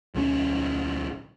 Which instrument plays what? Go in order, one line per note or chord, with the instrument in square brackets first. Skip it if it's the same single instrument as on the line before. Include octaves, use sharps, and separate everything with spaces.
[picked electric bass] D1 B1 B2 C#4